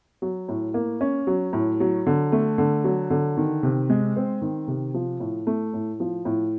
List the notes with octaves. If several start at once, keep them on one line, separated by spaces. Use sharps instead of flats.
F#3
A2
A#3
C#4
F#3
A2
F#3
D3
A3
D3
F#3
D3
D#3
C3
G#3
C4
D#3
C3
F3
A2
A3
A2
F3
A2